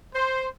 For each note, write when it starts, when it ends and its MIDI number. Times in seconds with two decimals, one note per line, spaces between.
0.14 0.47 72